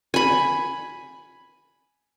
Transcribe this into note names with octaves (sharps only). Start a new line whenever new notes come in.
G#5 B5